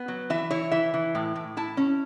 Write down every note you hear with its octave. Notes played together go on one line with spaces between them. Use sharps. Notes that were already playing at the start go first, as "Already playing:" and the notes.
Already playing: B3
F#3
E3 E5
E4 C#5
E3 E5
E3
A2
A2
E4 A5
C#4